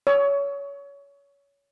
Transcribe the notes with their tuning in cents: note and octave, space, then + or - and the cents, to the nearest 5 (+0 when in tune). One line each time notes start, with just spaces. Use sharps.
C#5 +25